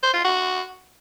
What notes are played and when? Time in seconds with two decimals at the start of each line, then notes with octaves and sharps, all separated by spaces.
0.03 C5
0.14 F4
0.25 F#4